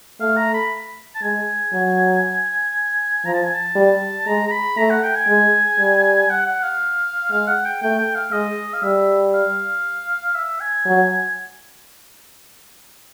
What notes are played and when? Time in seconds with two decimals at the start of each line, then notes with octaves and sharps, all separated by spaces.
0.20 A3 F5
0.37 A#5
0.54 B5
1.15 A5
1.22 G#3 G#5
1.73 F#3
3.25 F3 A#5
3.34 A5
3.44 G#5
3.54 A5
3.75 G3
4.27 G#3 A#5
4.48 A#5
4.51 B5
4.77 A3 A#5
4.90 F#5
5.03 G5
5.15 G#5
5.28 G#3
5.79 G3
6.30 F#5
6.46 F#5
6.63 F5
7.31 G#3 F5
7.48 F#5
7.65 G5
7.82 A3 G5
7.99 G5
8.15 F5
8.32 G#3 D#5
8.73 F5
8.83 G3 E5
9.34 F5
10.35 E5
10.60 G#5
10.86 F#3